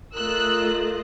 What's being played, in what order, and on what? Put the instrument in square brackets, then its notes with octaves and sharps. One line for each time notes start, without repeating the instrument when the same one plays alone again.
[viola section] A3 F4 D#5 [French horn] A#4 [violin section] E6 F#6